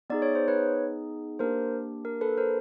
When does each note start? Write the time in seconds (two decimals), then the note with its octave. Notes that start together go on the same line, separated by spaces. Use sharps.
0.10 B3 D#4 G#4 D5
0.22 C#5
0.35 C5
0.48 B4 C#5
1.39 A#3 D4 G4 A#4 C5
2.05 A#4
2.21 A4 B4
2.38 A#4 C5